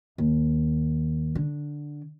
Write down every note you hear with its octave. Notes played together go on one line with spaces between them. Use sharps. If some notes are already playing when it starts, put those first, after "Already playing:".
D#2
D3